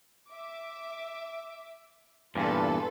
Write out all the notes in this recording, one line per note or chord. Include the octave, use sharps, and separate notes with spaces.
E5 D6
E2 G2 A#2 F4 A4 B4